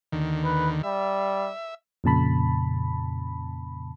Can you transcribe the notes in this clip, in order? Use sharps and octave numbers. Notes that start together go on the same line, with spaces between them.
D#2 D3 D#3
B4
G3 E5
F2 A#2 C#3 A5 B5